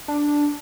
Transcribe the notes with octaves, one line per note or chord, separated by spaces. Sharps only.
D4